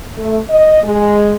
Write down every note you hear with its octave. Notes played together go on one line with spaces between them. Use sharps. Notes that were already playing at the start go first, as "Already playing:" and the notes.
A3
D#5
G#3